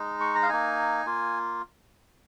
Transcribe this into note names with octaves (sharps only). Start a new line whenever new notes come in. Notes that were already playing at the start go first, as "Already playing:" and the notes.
Already playing: G#3 D#4
C#6
A#5
F5
A#3 D#4 G#5
A#3 F4